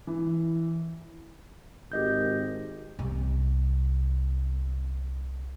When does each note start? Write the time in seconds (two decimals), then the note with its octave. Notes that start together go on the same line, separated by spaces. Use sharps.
0.07 E3
1.92 G#1 G4 D#5 G6
2.99 C2 C3